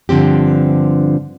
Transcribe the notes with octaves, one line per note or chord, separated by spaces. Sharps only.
G2 D3 F3 C4 G4